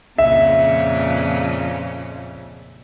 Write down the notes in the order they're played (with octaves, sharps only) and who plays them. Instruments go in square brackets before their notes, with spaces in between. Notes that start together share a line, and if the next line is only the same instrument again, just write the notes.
[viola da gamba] F2 A#2 C#3 [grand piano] E5